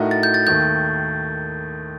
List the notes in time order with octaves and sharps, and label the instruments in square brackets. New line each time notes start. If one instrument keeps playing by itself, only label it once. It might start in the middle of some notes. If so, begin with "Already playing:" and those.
Already playing: [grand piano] A2 A3 D#4 F#4 A#4
[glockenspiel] A6
G6
A6
[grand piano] D#2 D#3 A3 [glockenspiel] G6